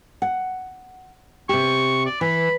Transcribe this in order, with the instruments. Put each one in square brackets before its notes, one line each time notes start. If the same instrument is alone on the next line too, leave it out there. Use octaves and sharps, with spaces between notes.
[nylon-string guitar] F#5
[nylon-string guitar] C3 G4 [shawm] C#6
[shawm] D5
[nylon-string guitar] E3 [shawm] B5